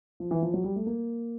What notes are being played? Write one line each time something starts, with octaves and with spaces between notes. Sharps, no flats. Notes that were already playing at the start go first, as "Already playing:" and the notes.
F3
E3
F3
F#3
G3
A3
A#3